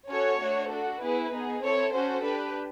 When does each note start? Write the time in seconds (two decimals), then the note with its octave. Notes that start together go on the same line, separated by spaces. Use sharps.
0.09 C#4 F#4 A4 C#5
0.40 A3 D4 F#4
0.70 D4 F#4 A4
1.01 B3 E4 G#4 B4
1.32 B3 D#4 G#4
1.63 C4 E4 A4 C#5
1.93 C#4 F#4 A4 C5
2.24 D4 G4 B4